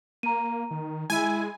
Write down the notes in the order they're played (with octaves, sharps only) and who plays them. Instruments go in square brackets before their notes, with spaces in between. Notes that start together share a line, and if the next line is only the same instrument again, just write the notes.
[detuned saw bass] A#3 [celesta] A#5 D#7
[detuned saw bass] D#3
[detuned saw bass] G#3 [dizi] E4 [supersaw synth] G#5